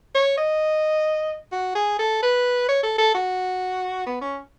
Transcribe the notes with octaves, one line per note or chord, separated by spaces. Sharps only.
C#5
D#5
F#4
G#4
A4
B4
C#5
A4
A4
F#4
B3
C#4